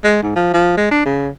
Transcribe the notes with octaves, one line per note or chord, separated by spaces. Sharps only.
G#3
G#2
F3
F3
G#3
D4
C#3